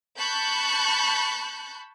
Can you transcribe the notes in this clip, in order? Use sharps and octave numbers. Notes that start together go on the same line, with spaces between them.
A5 B5 C#6 F#6 G6